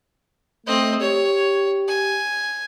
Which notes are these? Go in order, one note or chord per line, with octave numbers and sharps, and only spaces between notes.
A3 C4 D#5
G4 C#5
G#5